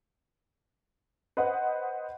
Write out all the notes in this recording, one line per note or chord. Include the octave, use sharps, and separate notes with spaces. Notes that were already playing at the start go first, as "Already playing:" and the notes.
B4 C5 D#5 F#5